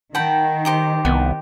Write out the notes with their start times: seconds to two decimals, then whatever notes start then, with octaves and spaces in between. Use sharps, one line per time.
0.15 D#3 F#5 G5 A5 B5
0.65 D#4 G4 C5
1.05 C2 B3